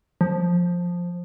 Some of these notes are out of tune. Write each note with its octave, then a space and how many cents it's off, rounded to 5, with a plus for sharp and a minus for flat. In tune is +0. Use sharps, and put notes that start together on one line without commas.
F3 +10